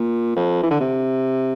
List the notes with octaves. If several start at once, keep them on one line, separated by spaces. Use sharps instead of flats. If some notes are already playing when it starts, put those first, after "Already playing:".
Already playing: A#2
F2
E3
D3
C3